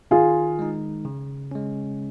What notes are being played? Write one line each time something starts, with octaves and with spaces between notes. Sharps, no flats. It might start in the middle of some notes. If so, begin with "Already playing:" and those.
D#3 F4 G#4
G#3 D#4
C#3
G#3 C#4